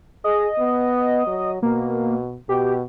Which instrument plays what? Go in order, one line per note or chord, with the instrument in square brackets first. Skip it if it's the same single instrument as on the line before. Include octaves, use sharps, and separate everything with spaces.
[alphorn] G#4 [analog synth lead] D#5
[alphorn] B3
F#3
[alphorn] B2 [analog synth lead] A#3
[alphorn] B2 [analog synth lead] G4